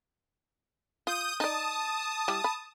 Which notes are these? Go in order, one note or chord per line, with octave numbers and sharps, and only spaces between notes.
F4 D#6 G6 D#7
D#4 D5 A5 D#6
G3 E4
B5